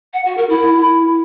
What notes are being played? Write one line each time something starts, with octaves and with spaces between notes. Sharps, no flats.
F#5
F#4
A#4
E4